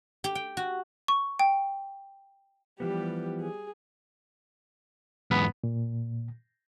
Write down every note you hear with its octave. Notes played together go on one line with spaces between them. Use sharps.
G4
G5
F#4
C#6
G5
E3 F3 G3 B3 G4
G#4
E2 G#2 B3
A#2